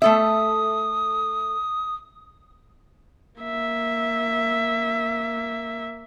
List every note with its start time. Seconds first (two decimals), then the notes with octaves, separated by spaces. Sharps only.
0.02 A3 A4 E5 D#6
3.42 A#3 E5